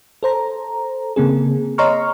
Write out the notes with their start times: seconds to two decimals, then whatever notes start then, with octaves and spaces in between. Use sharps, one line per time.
0.23 A4 C5 A#5
1.16 C#3 A#3 C4 G#4
1.78 C#5 D#5 A#5 C6 C#6 F6